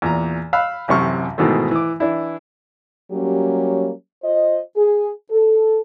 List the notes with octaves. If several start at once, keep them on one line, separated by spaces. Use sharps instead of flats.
E2 A#2 A#5
F5 B5 E6 F#6
A1 F#2 C3 C#6 F6
G#2 B2 D#3 E3 A3
E3 D6
E3 D4 E4
F#3 G3 A#3 C#4 G4
F4 C5 D#5
G#4
A4